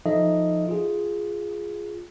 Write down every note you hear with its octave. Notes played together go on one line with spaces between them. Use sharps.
F3 D#4 A4 D#5 E5
F4 G#4